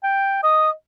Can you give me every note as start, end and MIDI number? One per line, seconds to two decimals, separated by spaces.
0.03 0.41 79
0.43 0.71 75
0.43 0.70 87